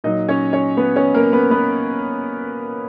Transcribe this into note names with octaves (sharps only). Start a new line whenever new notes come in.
A#2 F#3 D#4 D#5
C#4 C#5
C#4 C#5
B3 B4
C#4 C#5
A#3 A#4
B3 B4
B3 B4